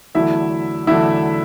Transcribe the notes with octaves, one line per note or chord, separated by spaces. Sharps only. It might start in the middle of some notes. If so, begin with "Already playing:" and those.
E2 D3 F#3 A3 E4 E5
E2 D3 F#3 A3 E4 E5